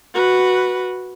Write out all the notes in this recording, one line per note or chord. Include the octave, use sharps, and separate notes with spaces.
F#4 B4